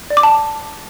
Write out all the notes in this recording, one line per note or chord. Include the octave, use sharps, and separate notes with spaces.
D5
D6
A5